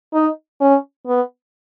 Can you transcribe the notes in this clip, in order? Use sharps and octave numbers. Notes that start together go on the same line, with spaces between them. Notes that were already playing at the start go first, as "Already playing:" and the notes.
D#4
C#4
B3